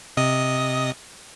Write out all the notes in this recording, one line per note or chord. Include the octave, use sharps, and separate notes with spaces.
C3 D#5 D#6